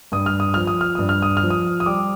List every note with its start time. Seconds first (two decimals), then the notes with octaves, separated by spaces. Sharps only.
0.12 G2 D#6
0.26 F6
0.40 D#6
0.54 F3 F6
0.67 D#6
0.81 F6
0.95 G2 D#6
1.09 F6
1.22 D#6
1.37 F6
1.43 F3
1.50 D#6
1.80 D#6
1.86 G3 D6